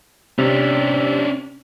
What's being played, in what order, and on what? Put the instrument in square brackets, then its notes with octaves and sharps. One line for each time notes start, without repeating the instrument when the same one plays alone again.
[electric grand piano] C3 [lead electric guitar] C#4 D4